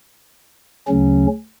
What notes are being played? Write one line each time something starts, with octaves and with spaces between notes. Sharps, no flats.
D2 C#3 F#3 C#4